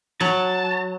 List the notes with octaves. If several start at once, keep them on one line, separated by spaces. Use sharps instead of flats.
F#3 A5